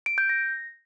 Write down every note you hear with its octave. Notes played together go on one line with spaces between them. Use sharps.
D7
G6
A#6